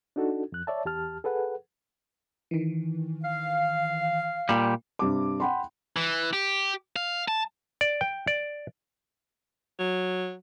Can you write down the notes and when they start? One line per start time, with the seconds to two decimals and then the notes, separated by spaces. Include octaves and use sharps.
0.16 D4 D#4 F#4 A4
0.52 F2 F#6
0.67 C#5 D5 E5 A5
0.85 E2 G4 A5 F6
1.24 G#4 A4 B4 F#5
2.51 D#3 E3
3.24 F5
4.49 A#2 G3
4.99 G2 C3 D6
5.40 F#5 G5 B5 C6
5.96 E3
6.33 G4
6.96 F5
7.28 A5
7.81 D5
8.01 G5
8.27 D5
9.79 F#3